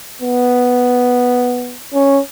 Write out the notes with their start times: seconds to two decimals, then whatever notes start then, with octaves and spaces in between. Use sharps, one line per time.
0.22 B3
1.94 C#4